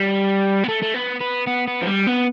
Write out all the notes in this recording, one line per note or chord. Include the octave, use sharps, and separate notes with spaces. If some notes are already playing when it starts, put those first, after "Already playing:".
Already playing: G3
B3
A3
A3
B3
B3
B3
B3
F3
G3
B3